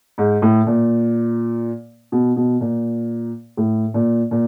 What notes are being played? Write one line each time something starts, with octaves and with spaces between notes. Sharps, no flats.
G#2
A2
A#2
B2
B2
A#2
A2
A#2
A#2